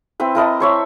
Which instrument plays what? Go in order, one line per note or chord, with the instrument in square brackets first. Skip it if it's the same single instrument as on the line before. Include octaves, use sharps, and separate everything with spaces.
[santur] C4 E4 B4
E4 A#4 D#5 A5
C5 C#5 E5